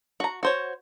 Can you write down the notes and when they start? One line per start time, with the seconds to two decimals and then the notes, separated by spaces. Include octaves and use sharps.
0.20 F#4 A#5
0.43 F#4 C5 C#5